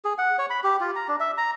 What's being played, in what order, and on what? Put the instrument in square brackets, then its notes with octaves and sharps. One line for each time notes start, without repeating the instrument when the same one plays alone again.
[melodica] G#4
F#5
C#5
B5
G4
F4
A#5
D4
E5
A#5